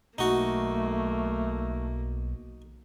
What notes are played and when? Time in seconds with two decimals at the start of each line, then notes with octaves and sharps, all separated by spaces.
0.18 B1 A3 A#3 D#4 F#4